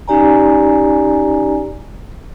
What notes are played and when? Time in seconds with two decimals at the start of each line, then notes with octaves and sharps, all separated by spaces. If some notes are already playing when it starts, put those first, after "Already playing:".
0.08 C#4 D#4 G4 D5 G#5 A#5